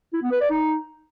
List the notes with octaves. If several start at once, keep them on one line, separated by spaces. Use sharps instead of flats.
E4
B3
B4
D5
D#4